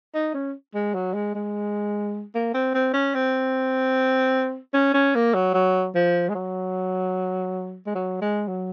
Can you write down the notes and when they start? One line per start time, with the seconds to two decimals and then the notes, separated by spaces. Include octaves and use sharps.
0.15 D#4
0.34 C#4
0.74 G#3
0.94 F#3
1.14 G#3
1.35 G#3
2.35 A#3
2.54 C4
2.74 C4
2.94 C#4
3.14 C4
4.74 C#4
4.94 C#4
5.15 A#3
5.34 F#3
5.54 F#3
5.95 F3
6.29 G#3
6.35 F#3
7.86 G#3
7.95 F#3
8.22 G#3
8.48 F#3